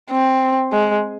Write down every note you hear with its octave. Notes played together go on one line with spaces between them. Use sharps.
C4
G#3